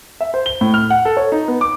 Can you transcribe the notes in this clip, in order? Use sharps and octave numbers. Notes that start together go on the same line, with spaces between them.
E5
C5
G7
A2
F6
F#5
A4
C#5
D#4
B3
D6